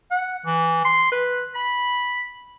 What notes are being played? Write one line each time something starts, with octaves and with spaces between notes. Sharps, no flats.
F#5
E3
C6
B4
B5